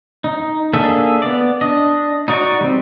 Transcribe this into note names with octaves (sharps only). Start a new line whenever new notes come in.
D#4
A#3 D4 G#4 A4 E5
B3 D5
D4 D#5
D#4 F#4 D5 C#6
G3 C4